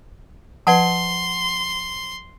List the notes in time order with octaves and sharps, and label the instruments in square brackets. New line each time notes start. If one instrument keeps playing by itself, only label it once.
[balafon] F3 B4 [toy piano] F#5 A5 [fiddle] C6